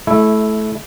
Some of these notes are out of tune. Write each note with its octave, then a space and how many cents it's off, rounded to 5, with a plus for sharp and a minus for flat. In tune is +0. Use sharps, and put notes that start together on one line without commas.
A3 -25 E4 +0